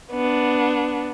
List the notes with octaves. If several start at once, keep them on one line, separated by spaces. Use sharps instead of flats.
B3 D4